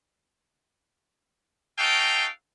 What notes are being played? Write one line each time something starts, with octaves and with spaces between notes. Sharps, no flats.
C#4 D#4 F#4 A4 F5 G5